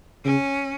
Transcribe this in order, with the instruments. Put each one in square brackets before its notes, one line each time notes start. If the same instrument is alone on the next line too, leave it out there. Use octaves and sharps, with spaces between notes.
[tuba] C#3 [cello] C#4